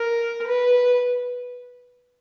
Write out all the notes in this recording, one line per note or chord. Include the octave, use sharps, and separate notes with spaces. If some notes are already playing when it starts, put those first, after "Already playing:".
Already playing: A#4
B4